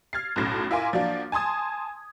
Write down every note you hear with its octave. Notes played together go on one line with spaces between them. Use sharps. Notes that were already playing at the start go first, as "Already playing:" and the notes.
F6 G#6 A6 C7
B1 F#2 A2 A#6
E4 F4 A#4 G#5 C6 D6
F3 F#3 A#3 D4
G#5 A5 C6 D#6 G#6